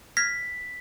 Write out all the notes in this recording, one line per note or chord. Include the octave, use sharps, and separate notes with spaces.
F6 G#6 A#6 B6